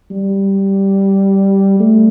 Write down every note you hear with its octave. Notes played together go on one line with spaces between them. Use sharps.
G3
A3